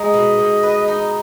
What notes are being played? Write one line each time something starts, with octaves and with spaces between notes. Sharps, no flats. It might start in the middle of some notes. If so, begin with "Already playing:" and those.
Already playing: G#3 D#4 D#5
B2
B2
B4
D#4